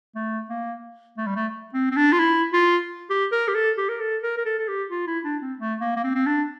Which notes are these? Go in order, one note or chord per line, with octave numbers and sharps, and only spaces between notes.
A3
A#3
A3
G3
A3
C4
C4
D4
F4
E4
F4
G4
A#4
G4
A4
G4
A#4
A4
A#4
A#4
A4
A4
G4
F4
E4
D4
C4
A3
A#3
A#3
C4
C4
D4